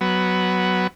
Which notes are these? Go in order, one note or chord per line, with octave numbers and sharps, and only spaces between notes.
F#3 B3